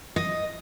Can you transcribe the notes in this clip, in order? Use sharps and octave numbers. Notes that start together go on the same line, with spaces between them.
D#5